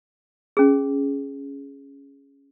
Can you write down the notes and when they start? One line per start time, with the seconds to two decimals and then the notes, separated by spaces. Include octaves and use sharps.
0.57 C#4 G#4